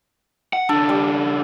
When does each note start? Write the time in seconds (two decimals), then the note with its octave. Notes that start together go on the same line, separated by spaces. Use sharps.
0.53 F#5
0.69 C#3 D4 A4
0.89 G3